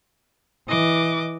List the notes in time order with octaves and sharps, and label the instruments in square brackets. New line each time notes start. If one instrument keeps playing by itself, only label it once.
[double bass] E3 [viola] D#5 D6